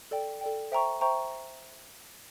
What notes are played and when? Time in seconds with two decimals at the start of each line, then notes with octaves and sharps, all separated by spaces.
0.11 A4 D5 G5
0.41 A4 D5 G5
0.72 C5 E5 G5 A#5 C#6
1.01 C5 E5 G5 A#5 C#6